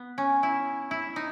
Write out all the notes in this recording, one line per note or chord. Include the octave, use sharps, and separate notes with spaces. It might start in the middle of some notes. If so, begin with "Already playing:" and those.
Already playing: B3
C#4
E4
E4
D#4